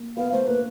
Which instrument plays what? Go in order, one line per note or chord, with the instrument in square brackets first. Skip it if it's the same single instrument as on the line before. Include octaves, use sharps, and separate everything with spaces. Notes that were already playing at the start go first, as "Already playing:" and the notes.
Already playing: [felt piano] A#3
[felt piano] B3 [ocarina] F5
[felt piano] A3 [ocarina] C5
[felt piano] A#3 [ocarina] B4